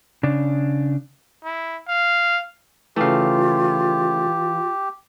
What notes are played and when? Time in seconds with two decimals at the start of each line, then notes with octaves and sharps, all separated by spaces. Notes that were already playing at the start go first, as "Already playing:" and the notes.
0.23 C#3 D4
1.44 E4
1.88 F5
2.96 C#3 E3 A3 F4 G4 F5